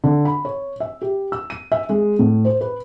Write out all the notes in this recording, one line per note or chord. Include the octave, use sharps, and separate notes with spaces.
D3
B5
C#5
E5
G4
E6
D#7
E5
G#3
A2
C5
B4